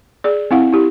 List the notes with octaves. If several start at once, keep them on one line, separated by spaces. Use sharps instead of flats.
G#4 D5
C4 E4 F5 F#5
E4 G4